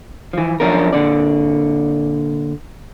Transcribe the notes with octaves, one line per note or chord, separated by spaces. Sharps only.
E3 F3
B1 F#2 F3 C#4 D4 A#4
A#2 D3 D5